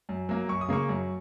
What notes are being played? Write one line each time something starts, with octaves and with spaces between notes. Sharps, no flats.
F#2
F#3 A#3
F#2 C#6
D#6
C#3 A#3 C#6
F#2